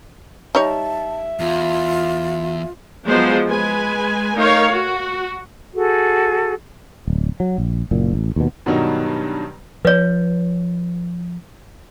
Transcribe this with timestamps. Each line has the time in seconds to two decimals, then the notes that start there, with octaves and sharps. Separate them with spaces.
0.55 G3 D#4 C#5 E5 A5
1.40 E2 F4
3.07 F3 F#3 G#3 B3 C5
3.48 G#3 B4 G#5
4.36 A3 D#4 A#4 C#5 F5
4.71 F#4
5.74 F#4 G#4 A4
7.07 D1
7.40 F#3
7.58 A#1
7.91 F#1 A#2
8.13 A1
8.36 D#2 B2
8.66 G2 B2 D#3 F#3 G3 D#4
9.85 F3 B4 C#5